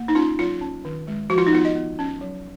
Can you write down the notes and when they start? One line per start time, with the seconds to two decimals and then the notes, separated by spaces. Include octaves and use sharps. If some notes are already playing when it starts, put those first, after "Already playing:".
Already playing: A#3
0.08 D#4
0.15 C#4 F4
0.39 F#3 F4
0.61 C#4
0.85 D#3
1.08 G#3
1.30 F3 F#4
1.38 F4
1.47 D#4
1.53 B3 F4
1.65 D#5
1.75 B3
1.99 C#4
2.21 F#3